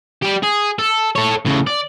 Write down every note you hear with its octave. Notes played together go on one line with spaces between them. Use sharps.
G3 G4
G#4
A4
A4 C#5
A2 C#3
D5